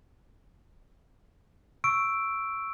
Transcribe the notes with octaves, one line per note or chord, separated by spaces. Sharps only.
C#6 E6 D7